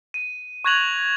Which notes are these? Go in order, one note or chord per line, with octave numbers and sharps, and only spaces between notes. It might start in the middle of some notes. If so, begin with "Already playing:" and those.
D#7
C#6 F#6 G#6 A#6 F7 F#7